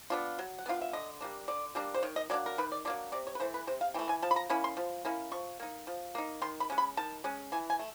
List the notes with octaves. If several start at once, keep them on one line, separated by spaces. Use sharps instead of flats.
B3 D4 F4
F#3
F#5
B3 D4 F4 F5
E5
D3 D#5
G3 A#3 D4
D3 D5
G3 A#3 D4
C5
D#3 C#5
D#5
F#3 A#3 D4 D5
A#4
D#3 B4
D5
F#3 A#3 D4 D5
C3 D5
C#5
B4
E3 A3 C5
B4
C3 C5
F5
E3 A3 G5
G#5
F3 A5
B5
A#5
A#3 C#4 E4 B5
C6
F3
A#3 C#4 E4
F3 C#6
A#3 D#4
F3
A#3 D#4
D#3 C6
B5
G#3 C#4
B5
D#3 A5
G#3 C#4
E3 G#5
G#5
A3